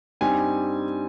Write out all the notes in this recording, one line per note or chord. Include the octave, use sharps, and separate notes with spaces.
G2 G3 C4 D#4 G#5